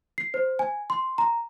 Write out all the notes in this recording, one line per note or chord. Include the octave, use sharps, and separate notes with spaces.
C7
C5
G#5
C6
A#5